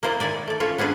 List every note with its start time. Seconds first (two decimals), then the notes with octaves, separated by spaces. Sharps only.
0.03 A#3 E4 C5 D5 D#5
0.20 D#3 E4 D5 G#5
0.48 A3 D5
0.60 C#4 F4 A4 C#5
0.78 B3 C#4 D4 G#4 B4